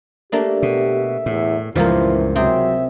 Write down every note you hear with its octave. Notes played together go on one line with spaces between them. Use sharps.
A3 A#3 D4 G4
B2 E5
E2 A2
C#2 G2 A#2 E3 F3 A#3 F4
C3 F#3 G#4 E5 G5